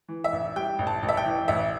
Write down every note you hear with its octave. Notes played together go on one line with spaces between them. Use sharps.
E3
E5
A1
G3 G5
A1
A5
A1
E5
G5
E3
A1 E5